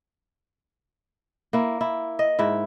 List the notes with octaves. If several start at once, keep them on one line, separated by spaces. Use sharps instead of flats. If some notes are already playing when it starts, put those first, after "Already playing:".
A#3 E4
E4
D#5
G#2 E4